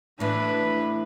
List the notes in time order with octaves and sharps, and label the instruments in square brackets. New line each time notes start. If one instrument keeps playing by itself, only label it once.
[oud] A2 E3 [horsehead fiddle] D4 B4